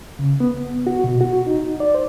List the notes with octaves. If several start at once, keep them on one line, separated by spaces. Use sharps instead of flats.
C#3
B3
F#4
B2
F#4
D#4
D5
C5